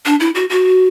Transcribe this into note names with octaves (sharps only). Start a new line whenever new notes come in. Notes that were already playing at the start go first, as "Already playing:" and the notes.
D4
E4
F#4
F#4